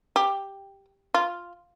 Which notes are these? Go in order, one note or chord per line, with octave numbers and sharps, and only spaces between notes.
G4
F4